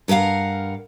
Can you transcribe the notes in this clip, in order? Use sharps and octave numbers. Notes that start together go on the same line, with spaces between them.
G2 A#4 B4 F5 F#5